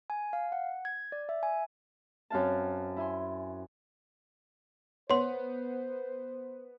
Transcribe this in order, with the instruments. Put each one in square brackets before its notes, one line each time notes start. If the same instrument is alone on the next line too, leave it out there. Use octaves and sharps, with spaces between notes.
[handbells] G#5
F5
F#5
G#6
D5
E5
G#5
[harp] F#2 C4 F5 A5
E4 E5 G#5 C6
[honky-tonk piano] B3 [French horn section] C5 [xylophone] C#5 C6